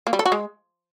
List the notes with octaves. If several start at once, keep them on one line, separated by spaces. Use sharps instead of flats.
A#3
G3
A4
F#4
G#3